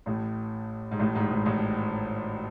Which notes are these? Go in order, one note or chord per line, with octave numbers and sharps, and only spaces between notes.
A1 A2
G#2
A1 A2
G#1 G#2
G#1 G#2
A1 A2